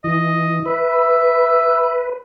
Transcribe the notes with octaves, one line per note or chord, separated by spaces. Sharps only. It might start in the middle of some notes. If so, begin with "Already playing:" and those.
E3 D#5
B4 E5